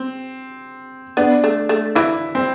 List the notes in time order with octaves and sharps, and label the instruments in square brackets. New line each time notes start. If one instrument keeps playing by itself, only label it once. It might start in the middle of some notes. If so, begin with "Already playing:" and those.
Already playing: [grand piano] C4
[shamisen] B3 [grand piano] D4
[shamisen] A3
A3
[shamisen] E3 [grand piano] E4
[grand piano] C4